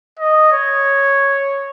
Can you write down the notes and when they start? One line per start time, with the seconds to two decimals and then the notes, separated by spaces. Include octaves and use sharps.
0.19 D#5
0.52 C#5